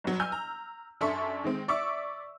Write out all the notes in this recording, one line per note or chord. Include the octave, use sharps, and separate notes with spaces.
G1 F#3
G#5 E6 F6 G6
A#5
F#2 D4 A4 E5 C6 C#6
D#3 G#3 C4
D5 E5 C#6 D6 E6